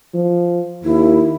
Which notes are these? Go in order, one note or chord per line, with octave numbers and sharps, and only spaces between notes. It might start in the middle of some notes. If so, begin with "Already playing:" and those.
F3
D#2 E4